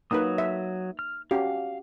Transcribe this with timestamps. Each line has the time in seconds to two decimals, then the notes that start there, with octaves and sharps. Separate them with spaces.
0.11 F#3 A#3 D#4 B4 D#6
0.38 E5
0.99 F6
1.31 C#4 F#4 G4 F5